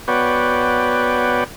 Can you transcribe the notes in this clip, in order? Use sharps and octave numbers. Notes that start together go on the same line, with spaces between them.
B3 F#4 B4 C#5 D5 G5